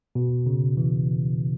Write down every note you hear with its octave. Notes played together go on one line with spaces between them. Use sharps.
B2
C#3
E3